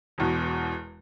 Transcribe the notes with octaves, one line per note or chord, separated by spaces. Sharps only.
E1 E2 B2